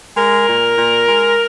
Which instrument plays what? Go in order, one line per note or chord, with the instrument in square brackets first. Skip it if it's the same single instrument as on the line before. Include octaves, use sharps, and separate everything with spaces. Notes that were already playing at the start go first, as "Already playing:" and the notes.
[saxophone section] G#3 A#4
A#2
A#2
G#3